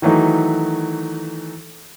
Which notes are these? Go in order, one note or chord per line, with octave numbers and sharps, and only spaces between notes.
D#3 E3 F#3 A3 D#4